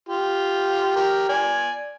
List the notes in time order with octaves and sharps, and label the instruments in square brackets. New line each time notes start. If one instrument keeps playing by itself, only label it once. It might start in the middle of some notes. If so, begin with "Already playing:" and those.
[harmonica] F4 G4
G4 A#4
D5 G#5